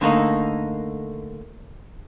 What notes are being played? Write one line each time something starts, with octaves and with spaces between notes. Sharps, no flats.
D3 A3 A#3 D#4